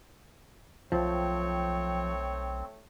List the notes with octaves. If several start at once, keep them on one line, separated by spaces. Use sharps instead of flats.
B1 F3 A3 C4 C#5 G5